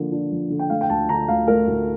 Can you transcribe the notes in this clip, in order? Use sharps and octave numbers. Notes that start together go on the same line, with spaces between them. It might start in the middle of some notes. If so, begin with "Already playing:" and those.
Already playing: D3 F3 A#3 D4
D4
F3
D3
G5
A3 F5
G5
D2 A5
D3 A#5
D2 F5
A3 A#4
D2